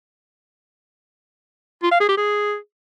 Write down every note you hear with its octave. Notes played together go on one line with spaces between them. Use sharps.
F4
F5
G#4
G4
G#4